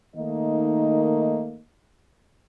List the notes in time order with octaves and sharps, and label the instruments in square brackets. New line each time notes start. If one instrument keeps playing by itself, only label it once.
[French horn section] D#3 A3 A#3 D#4 D#5